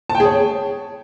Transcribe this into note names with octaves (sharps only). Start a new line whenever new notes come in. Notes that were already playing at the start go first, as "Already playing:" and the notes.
A5
G5
G#4
C#5